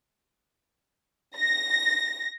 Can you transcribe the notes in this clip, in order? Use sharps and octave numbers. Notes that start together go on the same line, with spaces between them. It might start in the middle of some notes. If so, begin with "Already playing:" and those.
A#6